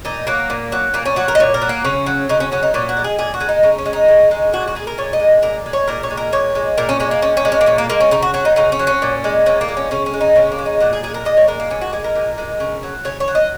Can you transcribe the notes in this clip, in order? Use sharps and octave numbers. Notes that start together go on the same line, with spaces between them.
A#2 D#4
F#3 A#3
A#2
F#3
A#2 A#3
C#4
F#3 F#4
A#4
D#5
A#2 C#5
A#4
F#3
A#3
C#3 C#4
F#3
C#3 D#4
C#4
F#3 C#4
D#4
A#2 C#4
F#4
G#3
G#4
A#2 G#4
F#4
G#3
D#4
C#3 D#4
C#4
G#3
D#4
C#3
G#3
A#2 F#4
F#4
G#3 G#4
A#4
A#2 C#5
D#5
G#3
A#2 A#4
G#3
C#5
A#2 A#4
C#5
G#3
A#4
A#2 C#5
G#3
A#2 A#4
C#4
G#3 C#4
A#3
A#2 C#4
C#4
G#3
C#4
A#3
A#2 C#4
A#3
G#3 A#3
C#4
C#3 D#4
F#4
F#3 F#4
D#4
C#3 D#4
C#4
F#3
C#4
A#2
G#3
A#2 C#4
A#3
G#3
C#4
C#3 C#4
C#4
G#3
D#4
C#3 C#4
A#3
G#3
D#4
A#2 F#4
G#4
G#3 G#4
A#4
A#2 D#5
C#5
G#3 A#4
A#3
A#2 C#4
F#4
G#3 G#4
A#4
A#2
G#3
C#3
F#3
C#3 C#5
C#5
F#3
D#5